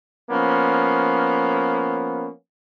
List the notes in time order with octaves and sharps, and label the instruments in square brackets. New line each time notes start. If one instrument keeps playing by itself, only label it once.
[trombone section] F3 A#3 B3 C#4